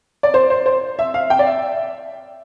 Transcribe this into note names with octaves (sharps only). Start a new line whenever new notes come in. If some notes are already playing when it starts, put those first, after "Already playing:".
D5
C5
C5
C5
E5
F5
G5
D5
E5